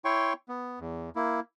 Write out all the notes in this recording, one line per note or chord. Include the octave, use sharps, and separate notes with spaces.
E4 C#5 G5 C6 C#6
B3
E2
A#3 E4